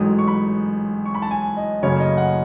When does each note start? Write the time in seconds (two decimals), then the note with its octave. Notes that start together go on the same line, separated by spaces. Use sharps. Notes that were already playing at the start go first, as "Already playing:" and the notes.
Already playing: A1 G#2 F#3 A3 D#6
0.19 C#6
0.28 B5
1.06 C#6
1.15 B5
1.22 A5
1.31 G#5
1.57 D#5
1.83 F#1 F#2 C#3 F#3 A3 C#5
2.00 D#5
2.17 F#5